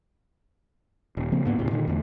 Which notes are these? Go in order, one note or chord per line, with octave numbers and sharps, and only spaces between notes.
D#1
C#3 F3 A#3 C4
D2 G#2 A#3 B3
E1 C#2 A2 C3
A#2 D3 D#3
E2 D3 A3